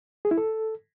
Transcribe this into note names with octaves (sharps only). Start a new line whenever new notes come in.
G#4
E4
A4